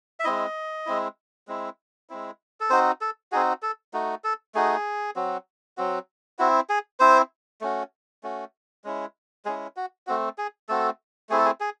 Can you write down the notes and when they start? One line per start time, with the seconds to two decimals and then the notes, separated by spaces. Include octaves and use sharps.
0.20 E5
0.24 G#3 C4 E4 D#5
0.86 G#3 C4 E4
1.48 G#3 C4 E4
2.10 G#3 C4 E4
2.60 A4
2.70 C4 D#4 F#4 C5
3.01 A4
3.32 C4 D#4 F#4 G#4
3.62 A4
3.94 A3 D#4 F#4
4.24 A4
4.55 A3 D#4 F#4 G#4
5.16 F#3 C4 F#4
5.77 F#3 C4 F#4
6.39 C4 E4 F#4
6.70 G#4
7.00 C4 E4 C5
7.61 A3 C#4 F#4
8.23 A3 C#4 F#4
8.84 G#3 C#4 E4
9.45 G#3 C#4 E4 G#4
9.77 F#4
10.07 A3 C4 F#4
10.38 G#4
10.69 A3 C4 F#4 A4
11.29 A3 C4 E4 G#4
11.38 A4
11.45 G#4
11.60 G#4